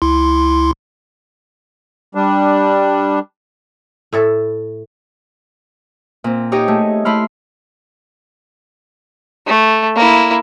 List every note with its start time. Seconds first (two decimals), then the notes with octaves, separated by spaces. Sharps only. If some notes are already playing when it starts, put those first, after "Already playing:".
0.02 C#2 E4 C6
2.15 G3 D4
4.13 A2 E4 A4
6.24 A#2 C4
6.52 D#4 G4 C#5 D#5
6.68 A3 G#4
7.05 A3 E4 B5 C6 F6
9.47 A3
9.96 A#3 E4